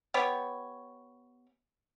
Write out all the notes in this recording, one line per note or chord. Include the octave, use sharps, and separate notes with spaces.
B3 G4 C#5